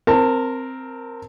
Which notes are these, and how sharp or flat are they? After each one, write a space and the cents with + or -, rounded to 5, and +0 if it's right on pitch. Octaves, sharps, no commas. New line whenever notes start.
C4 +0 A#4 +0 A5 +25